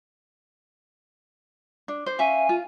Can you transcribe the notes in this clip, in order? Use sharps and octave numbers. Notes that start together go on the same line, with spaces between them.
D4
C5
C#4 E5 F5 G#5
F4